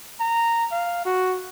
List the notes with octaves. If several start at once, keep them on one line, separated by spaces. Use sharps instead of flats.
A#5
F5
F#4